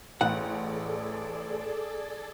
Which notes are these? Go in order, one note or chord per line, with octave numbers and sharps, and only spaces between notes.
A1 G#4 A4 D5 F#5